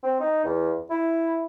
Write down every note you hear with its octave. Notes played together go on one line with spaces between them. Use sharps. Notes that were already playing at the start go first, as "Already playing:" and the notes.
C4
D#4
E2
E4